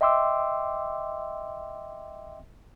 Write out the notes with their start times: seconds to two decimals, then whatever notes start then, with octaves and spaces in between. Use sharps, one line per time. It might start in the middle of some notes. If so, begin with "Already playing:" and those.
0.01 D#5 E5 G5 C6 D6 E6